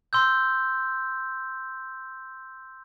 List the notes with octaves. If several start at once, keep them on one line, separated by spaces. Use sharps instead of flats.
C6 E6 G6